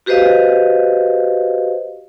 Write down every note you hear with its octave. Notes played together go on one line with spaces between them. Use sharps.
F#4 G4 B4 C5 D#5 F5